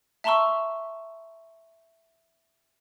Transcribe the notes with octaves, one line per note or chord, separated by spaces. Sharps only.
E5 A5 A#5 C6 C#6 E6